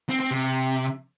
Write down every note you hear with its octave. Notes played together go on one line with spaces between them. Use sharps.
C4
C4
C3